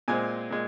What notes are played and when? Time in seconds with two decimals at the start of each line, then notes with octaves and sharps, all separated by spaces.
0.08 A#2 G#3 C4 G#5
0.50 A#2 G#3